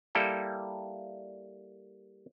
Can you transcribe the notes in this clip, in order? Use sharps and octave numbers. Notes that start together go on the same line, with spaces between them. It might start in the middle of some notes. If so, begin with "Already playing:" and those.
G3 A#3 E4 A4 G5